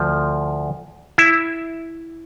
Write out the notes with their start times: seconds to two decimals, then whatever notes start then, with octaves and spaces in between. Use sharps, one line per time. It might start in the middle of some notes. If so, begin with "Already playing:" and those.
Already playing: D2 F3
1.18 E4